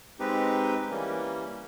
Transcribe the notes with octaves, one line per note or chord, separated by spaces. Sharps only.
G#3 C4 D#4 G4 B4
E3 G3 A#3 C#4